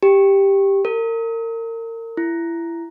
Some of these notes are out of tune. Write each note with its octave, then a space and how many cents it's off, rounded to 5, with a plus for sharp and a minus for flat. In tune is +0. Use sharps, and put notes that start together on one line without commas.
G4 +5
A#4 -35
E4 +25